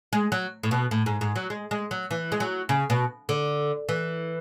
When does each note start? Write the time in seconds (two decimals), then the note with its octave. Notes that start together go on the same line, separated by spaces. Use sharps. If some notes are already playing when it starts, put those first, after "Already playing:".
0.13 G#3
0.32 F#3
0.63 A2
0.71 B2
0.91 A2
1.06 G#2
1.21 G#2
1.36 F#3
1.50 G#3
1.71 G#3
1.91 F#3
2.11 E3
2.32 G#3
2.40 F#3
2.69 C#3
2.90 B2
3.29 D3
3.89 E3